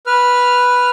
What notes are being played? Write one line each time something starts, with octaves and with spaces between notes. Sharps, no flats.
B4 F6